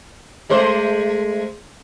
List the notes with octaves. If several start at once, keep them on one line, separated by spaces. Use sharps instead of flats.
G#3 A3 C5